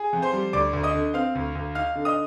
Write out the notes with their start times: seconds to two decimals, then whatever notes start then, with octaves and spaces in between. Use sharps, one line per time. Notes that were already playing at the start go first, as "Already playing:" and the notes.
Already playing: G#4
0.13 F2
0.22 C5 C6
0.33 G3
0.53 D2 D5 D6
0.73 D2
0.83 D#5 D#6
0.95 D3
1.14 C4 F5 F6
1.35 D2
1.55 D2
1.75 D#4 F5 F6
1.95 D3
2.05 D#5 D#6